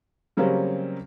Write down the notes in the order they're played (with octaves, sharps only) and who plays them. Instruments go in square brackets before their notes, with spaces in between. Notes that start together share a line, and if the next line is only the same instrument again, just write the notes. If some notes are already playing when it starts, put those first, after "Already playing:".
[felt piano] C#3 F#3 G3 A#3 C4 C#4